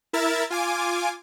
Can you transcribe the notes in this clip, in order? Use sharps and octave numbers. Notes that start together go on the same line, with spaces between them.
E4 A#4 E5 A6
F4 G#5 D6